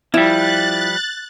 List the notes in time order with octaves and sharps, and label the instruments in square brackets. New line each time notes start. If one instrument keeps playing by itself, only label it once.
[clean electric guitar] F3 G3 [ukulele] E4 [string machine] F#6 A6